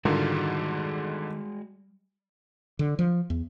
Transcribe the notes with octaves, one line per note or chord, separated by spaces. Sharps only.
G#2 D3 D#3 G3 G#3 F4 F#4 G#4
D3
F3
E2